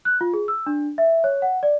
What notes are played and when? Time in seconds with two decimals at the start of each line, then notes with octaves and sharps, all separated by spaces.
0.05 F#6
0.21 F4
0.34 G#4
0.48 E6
0.66 D4
0.98 E5
1.24 C#5
1.42 F#5
1.63 D5